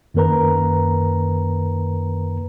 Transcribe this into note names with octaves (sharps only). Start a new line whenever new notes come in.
F#2 D#3 A#3 A#4 B4 A#5